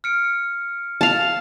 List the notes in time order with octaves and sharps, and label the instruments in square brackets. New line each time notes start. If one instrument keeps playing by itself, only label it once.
[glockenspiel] F6 C#7 D7
[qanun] F5 A5